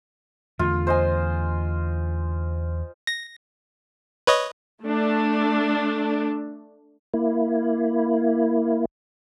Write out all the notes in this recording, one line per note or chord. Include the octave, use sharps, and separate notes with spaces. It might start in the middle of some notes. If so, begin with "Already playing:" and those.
E2 D3 A3 F4
C5 D#5 G#5
A#6
B4 C#5 D#5
A3 D4
A#3 E4